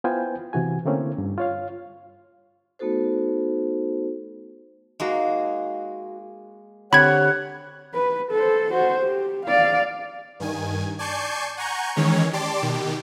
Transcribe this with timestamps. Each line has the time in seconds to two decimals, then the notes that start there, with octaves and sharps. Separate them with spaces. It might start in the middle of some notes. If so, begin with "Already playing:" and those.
0.04 B3 E4 F4 C5 G5 G#5
0.53 C3 E3 F#4 G#5
0.85 D3 A3 A#3 C4 C#4 E4
1.18 G2
1.38 F4 C#5 F5
2.79 A3 B3 D#4 F#4 A4 C5
5.00 G#3 A#3 D#4 F#4
6.93 D3 C4 G4 C#5 F#5 B5 G#6
7.94 B4
8.32 A4 C5
8.71 F#4 C5
9.03 G4
9.46 D5 F5
10.40 G2 D#3 G#5
10.99 D5 G#5 A5 C#6 G6 C7
11.57 F#5 G#5 A#5 C#6 G6
11.96 D#3 E3 G#3 C#4 C#5
12.33 G4 D5 A5 C6 D6
12.62 B2 D#3 G4